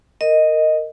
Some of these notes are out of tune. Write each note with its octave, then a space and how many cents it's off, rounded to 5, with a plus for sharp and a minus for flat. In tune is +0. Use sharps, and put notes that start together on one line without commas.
A#4 -15 D#5 +0